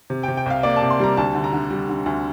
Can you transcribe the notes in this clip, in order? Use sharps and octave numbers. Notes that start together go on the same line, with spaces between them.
C3
C3 G5
G5
C2 F5
A#3 D5
A5
C2
C6
G3 A#5
D2 A5
D3
A#5
D3
G3
D3
D2